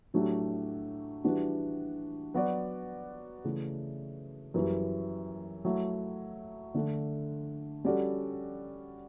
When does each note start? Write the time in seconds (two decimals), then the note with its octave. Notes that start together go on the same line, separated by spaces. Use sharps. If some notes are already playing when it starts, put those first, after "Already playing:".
0.14 A2 F#3 A3 D4 G4
1.24 E3 G3 D4 F#4
2.34 F#3 B3 F#4 B4 D5
3.45 C#3 E3 A3 E4
4.54 F#2 E3 G3
5.65 F#3 A3 E4
6.74 D3 A3 D4 A4
7.85 G3 C#4 F#4 A4 D5